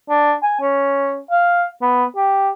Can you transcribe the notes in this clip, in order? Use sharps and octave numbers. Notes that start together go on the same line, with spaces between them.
D4
G#5
C#4
F5
B3
G4